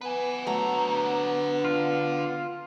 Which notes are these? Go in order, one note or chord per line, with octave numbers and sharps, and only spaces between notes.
B3 B4 G#5
D3 F#3 A3 A#5
F4